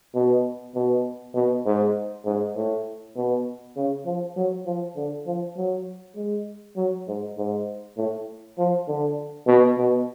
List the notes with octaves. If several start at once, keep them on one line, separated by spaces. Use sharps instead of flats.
B2
B2
B2
G#2
G#2
A2
B2
C#3
F3
F#3
F3
D3
F3
F#3
G#3
F#3
G#2
G#2
A2
F3
D3
B2
B2